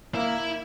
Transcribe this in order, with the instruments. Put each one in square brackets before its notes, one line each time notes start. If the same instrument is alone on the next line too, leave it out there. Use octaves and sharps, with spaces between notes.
[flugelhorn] A#3 [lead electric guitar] E4